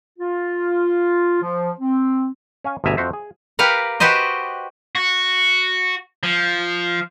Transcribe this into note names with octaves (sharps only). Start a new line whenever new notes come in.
F4
F3
C4
C#4 F5 G#5
G1 D2 B2 E5 G#5 A#5
F2 F#4 C5 E5
G#4
G4 A#4 B4 F5 F#5
F#4 G4 B4 C5 D#5
F#4
F3